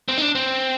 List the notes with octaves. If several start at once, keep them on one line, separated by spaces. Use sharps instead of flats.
C4
D#4
D4
C4